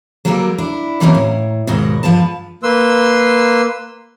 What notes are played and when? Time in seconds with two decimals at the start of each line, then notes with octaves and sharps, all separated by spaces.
0.25 F#3 G3 A#3 A4 A#4
0.58 D4 E4
1.00 C3 E3 F#3 A#3 C#4 D#4
1.15 A2
1.67 D#2 G#2 B2 F#4 D#5
2.03 G2 F3 B3 B4 A5
2.63 A#3 B4 C6 E6